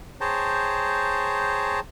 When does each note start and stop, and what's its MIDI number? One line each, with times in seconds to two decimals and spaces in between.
0.21 1.80 68
0.21 1.80 72
0.21 1.80 73
0.21 1.80 79
0.21 1.80 81
0.21 1.80 82